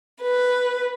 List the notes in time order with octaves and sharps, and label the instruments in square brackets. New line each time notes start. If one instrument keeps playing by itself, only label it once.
[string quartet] B4